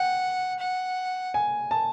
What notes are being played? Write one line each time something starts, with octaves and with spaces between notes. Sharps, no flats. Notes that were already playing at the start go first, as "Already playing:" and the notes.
Already playing: F#5 G5
F#5
G#5
A5